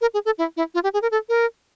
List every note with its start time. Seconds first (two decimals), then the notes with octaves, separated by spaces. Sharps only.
0.01 A#4
0.14 G#4
0.25 A4
0.38 E4
0.57 E4
0.74 F4
0.83 G4
0.93 G#4
1.02 A#4
1.11 A4
1.29 A#4